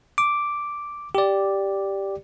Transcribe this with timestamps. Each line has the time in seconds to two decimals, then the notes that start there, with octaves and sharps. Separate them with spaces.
0.18 D6
1.15 G4 D5